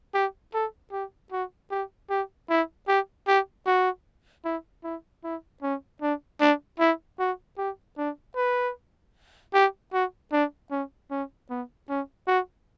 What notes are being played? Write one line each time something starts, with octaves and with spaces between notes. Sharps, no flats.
G4
A4
G4
F#4
G4
G4
E4
G4
G4
F#4
E4
E4
E4
C#4
D4
D4
E4
F#4
G4
D4
B4
G4
F#4
D4
C#4
C#4
B3
C#4
F#4